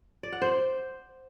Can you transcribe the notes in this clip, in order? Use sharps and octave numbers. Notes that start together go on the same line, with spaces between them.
D5
F#5
C5